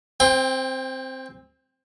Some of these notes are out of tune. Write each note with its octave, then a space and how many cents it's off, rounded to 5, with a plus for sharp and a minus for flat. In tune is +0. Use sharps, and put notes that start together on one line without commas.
C4 +0 G5 +35